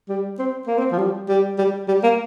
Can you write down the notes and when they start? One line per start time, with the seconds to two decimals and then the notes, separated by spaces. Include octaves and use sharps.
0.09 G3
0.39 C4
0.67 A#3
0.78 C4
0.92 F3
0.98 G3
1.28 G3
1.58 G3
1.88 G3
2.03 A#3